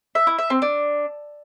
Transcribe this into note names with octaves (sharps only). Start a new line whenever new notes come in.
E5
E4
E5
C4
D4